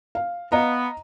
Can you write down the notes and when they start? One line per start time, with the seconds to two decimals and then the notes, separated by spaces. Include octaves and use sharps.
0.15 F5
0.52 B3 D#5 F5 A#5